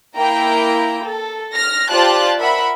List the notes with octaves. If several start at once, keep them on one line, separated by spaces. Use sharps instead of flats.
A#3 E4 G5 A#5
A4
F6 A#6
F4 G4 C5 D5 A5 F#6
A#4 E5 F#5 B5